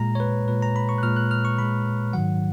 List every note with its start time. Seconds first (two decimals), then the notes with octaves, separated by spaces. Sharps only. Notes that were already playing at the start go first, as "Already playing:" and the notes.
Already playing: A#2 G#3 A#5
0.15 C#5
0.20 B4
0.48 A#2 G#3 B4
0.62 A#5
0.76 B5
0.89 C#6
0.98 F#6
1.03 A#2 G#3 F6
1.17 F#6
1.31 F6
1.45 C#6
1.58 A#2 G#3 B5
2.13 G#2 D#3 F#3 F#5